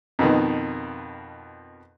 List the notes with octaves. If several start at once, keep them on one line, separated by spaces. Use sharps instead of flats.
F2 B2 D#3